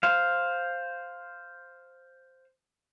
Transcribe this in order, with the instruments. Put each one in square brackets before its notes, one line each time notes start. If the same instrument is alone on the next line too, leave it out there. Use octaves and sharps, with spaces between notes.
[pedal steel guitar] C5 F5